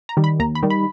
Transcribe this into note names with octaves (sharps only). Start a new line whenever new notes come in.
A#5
D#3 G3
B5
D#2 A#5
B5
D#3 G3
B5